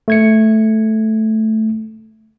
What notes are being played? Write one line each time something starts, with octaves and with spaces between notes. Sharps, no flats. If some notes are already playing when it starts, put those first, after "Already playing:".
A3 G#6 C#7